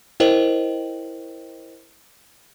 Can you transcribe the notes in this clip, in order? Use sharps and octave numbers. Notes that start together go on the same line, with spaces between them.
E4 A#4 C5 D#5 G5 F#7